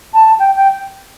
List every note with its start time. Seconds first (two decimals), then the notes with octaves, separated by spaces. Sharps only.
0.14 A5
0.39 G5
0.56 G5